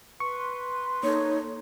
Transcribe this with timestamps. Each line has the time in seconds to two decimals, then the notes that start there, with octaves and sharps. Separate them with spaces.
0.20 B4 C6 C#6
1.03 A#3 D#4 A4 C#5